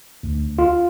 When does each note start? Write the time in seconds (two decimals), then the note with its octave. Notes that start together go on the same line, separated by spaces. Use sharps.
0.23 D2
0.59 F4